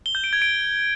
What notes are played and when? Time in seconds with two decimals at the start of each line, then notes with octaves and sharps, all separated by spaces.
0.06 G7
0.15 G6
0.24 D7
0.33 G#6
0.42 D7